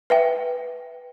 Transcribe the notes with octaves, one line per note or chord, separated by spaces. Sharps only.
B4 E5 G5